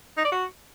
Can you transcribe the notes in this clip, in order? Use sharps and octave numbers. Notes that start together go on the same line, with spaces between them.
D#4
D5
F#4